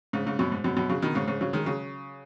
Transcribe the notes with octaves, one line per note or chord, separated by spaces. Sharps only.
G#2 C#3
G#2 C#3
F#2 B2
G#2
F#2 B2
F#2 B2
C#3 F#3
B2 D#3
G#2 C#3
G#2 C#3
C#3 F#3
D#3 G#3
C#3 F#3